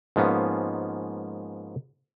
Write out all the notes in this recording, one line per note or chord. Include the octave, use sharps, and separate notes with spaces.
G#2 F3 A#3 B3 C#4